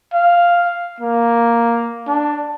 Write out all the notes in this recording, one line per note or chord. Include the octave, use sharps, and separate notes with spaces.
F5
A#3
D4